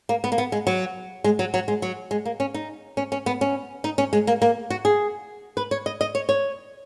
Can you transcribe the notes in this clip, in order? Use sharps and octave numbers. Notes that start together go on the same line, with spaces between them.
A#3
B3
A#3
B3
G#3
F#3
G#3
F#3
F#3
G#3
F#3
G#3
A#3
C#4
D#4
C#4
C#4
B3
C#4
D#4
C#4
G#3
A#3
A#3
F#4
G#4
B4
C#5
D#5
D#5
C#5
C#5